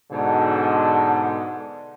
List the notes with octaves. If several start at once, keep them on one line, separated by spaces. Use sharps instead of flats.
G#2 B2 D3